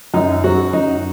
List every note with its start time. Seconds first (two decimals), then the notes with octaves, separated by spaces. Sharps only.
0.14 F#2 D#4
0.44 F#3 C#4 F#4
0.73 F#2 D#4